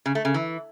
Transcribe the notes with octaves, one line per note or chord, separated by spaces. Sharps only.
C#3
A3
C#3
E3